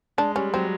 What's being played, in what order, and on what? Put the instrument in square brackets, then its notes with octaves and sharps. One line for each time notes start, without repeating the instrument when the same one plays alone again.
[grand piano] G#3 [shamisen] D4
[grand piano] G3 [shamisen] C#4
[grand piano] F#3 [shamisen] C4